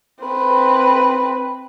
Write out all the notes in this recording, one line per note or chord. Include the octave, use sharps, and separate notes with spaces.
C4 B4